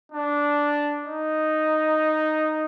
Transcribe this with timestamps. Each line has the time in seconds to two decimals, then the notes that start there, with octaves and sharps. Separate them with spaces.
0.12 D4
1.05 D#4